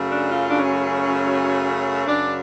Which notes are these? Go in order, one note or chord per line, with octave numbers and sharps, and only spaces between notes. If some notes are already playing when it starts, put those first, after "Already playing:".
Already playing: F#2 C#3 F#3 A3
D4
F4
D4
C#4
F#2 C#3 F#3 D4